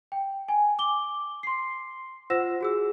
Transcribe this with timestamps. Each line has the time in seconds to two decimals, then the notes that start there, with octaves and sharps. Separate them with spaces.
0.12 G5
0.48 G#5
0.79 D6 G7
1.43 C6 C7
2.30 F4 C5 F#5 E6 A#6 E7
2.61 F#4 G#4 E6